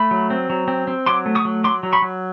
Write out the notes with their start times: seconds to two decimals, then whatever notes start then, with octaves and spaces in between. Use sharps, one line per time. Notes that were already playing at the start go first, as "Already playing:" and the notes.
Already playing: A3 B5
0.11 F#3
0.30 C4
0.50 F#3
0.68 C4
0.88 C4
1.06 F#3 C6 D6
1.26 A3
1.35 C#6 D#6
1.45 F#3
1.64 F#3 C6 D6
1.83 F#3
1.93 B5 C#6
2.02 F#3